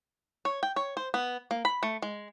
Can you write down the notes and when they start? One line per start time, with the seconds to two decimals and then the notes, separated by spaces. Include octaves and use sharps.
0.45 C#5
0.63 G5
0.76 C#5
0.97 C5
1.14 B3
1.51 A#3
1.65 B5
1.83 A3
2.02 G#3